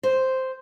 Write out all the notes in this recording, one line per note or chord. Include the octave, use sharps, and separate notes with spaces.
C5